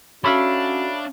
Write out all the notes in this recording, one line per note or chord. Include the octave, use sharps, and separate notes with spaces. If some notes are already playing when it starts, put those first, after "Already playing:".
C#4 D4 F#4 A4 C#5 E5 F5 B5